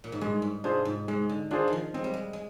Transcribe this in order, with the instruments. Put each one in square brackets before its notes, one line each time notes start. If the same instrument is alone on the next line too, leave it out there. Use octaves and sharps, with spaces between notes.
[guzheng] A#2
G#2
[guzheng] G2 [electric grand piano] G#3
[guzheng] G#2
[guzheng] C3 [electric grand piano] D4 F4 G#4 C5
[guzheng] G#2
[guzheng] G#2 [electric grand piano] G#3
[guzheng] D3
[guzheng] D#3 [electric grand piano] D4 F4 G#4 C5
[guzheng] D#3 F3
[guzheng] G#3 [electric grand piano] C4
[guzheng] G3
G#3
G#3